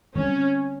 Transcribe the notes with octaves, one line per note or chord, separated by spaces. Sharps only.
D3 G3 C4 C#4